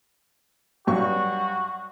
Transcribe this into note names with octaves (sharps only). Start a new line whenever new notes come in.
G2 F#3 F#4 C#6